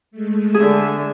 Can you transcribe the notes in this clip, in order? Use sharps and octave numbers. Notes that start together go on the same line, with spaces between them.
G#3 A3
D3 G#4 E5